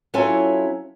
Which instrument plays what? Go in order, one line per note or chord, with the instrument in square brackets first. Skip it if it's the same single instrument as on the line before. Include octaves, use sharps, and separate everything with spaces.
[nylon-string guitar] F#3 C#4 E4 F4 A4 G#5